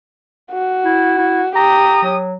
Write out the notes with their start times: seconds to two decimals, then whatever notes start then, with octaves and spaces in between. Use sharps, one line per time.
0.52 F#4
0.85 E4
1.18 E4
1.55 G4 A#5 D#6
2.03 F#3